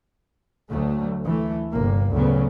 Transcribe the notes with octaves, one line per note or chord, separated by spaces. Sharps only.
D2 F#3 A3
E3 A3
G1 C3 A#3
D2 A2 C#3 F#3 B3